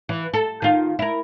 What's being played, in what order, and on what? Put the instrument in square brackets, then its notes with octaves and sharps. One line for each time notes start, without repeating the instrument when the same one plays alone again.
[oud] E3
A4
D#3 F4
E4 A#4